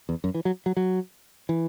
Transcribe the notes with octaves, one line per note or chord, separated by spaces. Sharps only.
E2
F#2
E3
F#3
F#3
F#3
E3